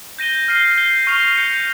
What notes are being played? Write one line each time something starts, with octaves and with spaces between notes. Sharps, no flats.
G6 A#6 D#7 G7
F6 C7 D#7 G7
G6 C7 G7
C#6 F6 C7 F7
G6 C#7 G7